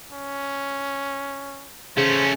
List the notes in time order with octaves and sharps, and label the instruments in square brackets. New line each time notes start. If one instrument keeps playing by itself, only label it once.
[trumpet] C#4
[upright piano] C#3 [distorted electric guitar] A3 C#4 [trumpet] C5